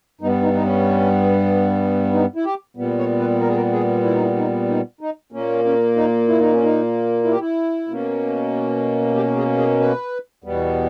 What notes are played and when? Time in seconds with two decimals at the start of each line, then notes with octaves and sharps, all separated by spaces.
0.21 G2 G3 B3 D#4
0.43 D#4
0.53 D#4
0.64 C#4
2.13 D#4
2.36 E4
2.45 G4
2.77 A#2 G3 B3
2.98 C#5
3.19 B4
3.41 A#4
3.48 G#4
3.56 A#4
3.73 G#4
4.04 E4
4.14 D#4
4.22 E4
4.37 D#4
4.69 D#4
5.01 D#4
5.32 A#2 A#3 C#4
5.65 C#4
5.96 D#4
6.28 E4
6.40 D#4
6.52 C#4
6.63 D#4
7.24 E4
7.31 G4
7.40 E4
7.88 B2 A#3 C#4
9.15 G4
9.37 G#4
9.58 G#4
9.80 B4
10.44 E2 B2 G3 B3